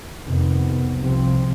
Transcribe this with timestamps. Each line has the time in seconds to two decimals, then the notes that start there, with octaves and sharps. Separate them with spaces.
0.23 F2 C3 D#3 B3
0.96 C2 C3 F3 C4